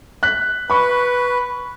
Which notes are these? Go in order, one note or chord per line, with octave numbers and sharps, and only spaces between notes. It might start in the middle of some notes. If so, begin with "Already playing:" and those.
F#6 B6
B4 B5 C#6